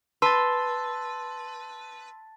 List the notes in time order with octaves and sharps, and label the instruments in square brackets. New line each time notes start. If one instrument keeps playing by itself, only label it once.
[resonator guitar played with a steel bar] B4 [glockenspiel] A5 A6 [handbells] C6 E6